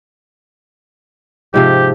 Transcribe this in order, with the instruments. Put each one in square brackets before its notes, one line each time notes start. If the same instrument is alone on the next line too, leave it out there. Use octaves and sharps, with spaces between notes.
[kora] G#2 C3 F3 [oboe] G4